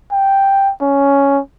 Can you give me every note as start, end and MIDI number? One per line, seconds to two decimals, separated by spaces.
0.12 0.72 79
0.81 1.40 61